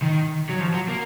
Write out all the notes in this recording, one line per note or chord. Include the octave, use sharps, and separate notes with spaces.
D#3
F#3
F3
F#3
A#3